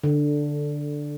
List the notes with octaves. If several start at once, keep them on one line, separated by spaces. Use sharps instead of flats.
D3